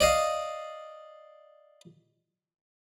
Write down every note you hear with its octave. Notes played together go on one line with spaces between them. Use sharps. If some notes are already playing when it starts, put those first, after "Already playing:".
D5 D#5 F5